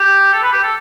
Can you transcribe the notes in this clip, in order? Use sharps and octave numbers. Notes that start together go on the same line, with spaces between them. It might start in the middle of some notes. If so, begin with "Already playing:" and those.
Already playing: G4
A4
B4
G4
A4